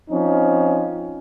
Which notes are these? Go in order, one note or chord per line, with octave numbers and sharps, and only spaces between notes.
F3 C4 C#4 D#4